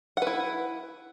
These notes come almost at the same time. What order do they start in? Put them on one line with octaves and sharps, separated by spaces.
F#5 B4 E4